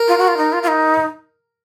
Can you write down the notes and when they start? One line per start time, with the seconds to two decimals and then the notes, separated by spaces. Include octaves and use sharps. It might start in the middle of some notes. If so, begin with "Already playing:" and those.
Already playing: A#4
0.08 F4
0.18 F#4
0.28 F4
0.37 D#4
0.53 F4
0.63 F4
0.68 D#4